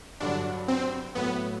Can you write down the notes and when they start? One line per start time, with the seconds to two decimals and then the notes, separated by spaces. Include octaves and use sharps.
0.20 G2 D3 F#3 D4
0.68 C4
1.15 A2 F#3 A3 B3